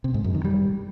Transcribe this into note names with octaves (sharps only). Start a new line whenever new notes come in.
C3
G#2
F#2
D#3
G3